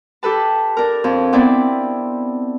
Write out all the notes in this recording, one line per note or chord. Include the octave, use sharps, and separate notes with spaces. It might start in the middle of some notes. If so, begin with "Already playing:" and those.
G4 A4 B4 A5
D4 A#4
F2
B3 C4 E4 D5